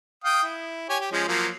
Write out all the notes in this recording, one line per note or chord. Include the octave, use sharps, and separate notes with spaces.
F5 G5 D#6
E4
G4 C#5 G#5
G4
F3 G#3 C#4
F3 F#3 A#3